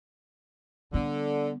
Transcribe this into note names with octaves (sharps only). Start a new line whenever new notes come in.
D3 G3 B3